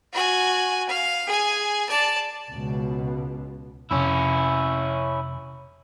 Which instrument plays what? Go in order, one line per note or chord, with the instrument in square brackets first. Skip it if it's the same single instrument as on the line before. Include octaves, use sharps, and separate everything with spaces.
[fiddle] F#4 G#5
F5
G#4 G#5
D5 A5
[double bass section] C#2 B2
[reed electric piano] F2 C3 [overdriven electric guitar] C#4 E4